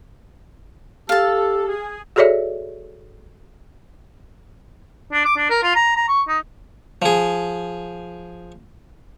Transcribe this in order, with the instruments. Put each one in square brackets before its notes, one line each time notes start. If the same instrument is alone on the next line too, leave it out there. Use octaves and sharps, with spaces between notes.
[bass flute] G4 [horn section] A4 [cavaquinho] F5 A5
[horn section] G#4
[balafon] F#4 G#4 A4 C#5 D5 E5
[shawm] D4
D6
D4
A#4
F4
A#5
A#5
C#6
D#4
[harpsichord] F3 G#4